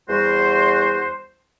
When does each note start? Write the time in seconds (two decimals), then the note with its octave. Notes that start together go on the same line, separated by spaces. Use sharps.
0.09 E2 G3 F#4 C5